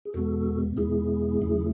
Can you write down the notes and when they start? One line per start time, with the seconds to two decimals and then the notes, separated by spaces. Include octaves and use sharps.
0.05 G#4
0.14 E2 B2 G#3 B3 F#4 A4
0.77 E2 B2 G#3 B3 E4 G#4
1.41 E2 C#3 F#3 A3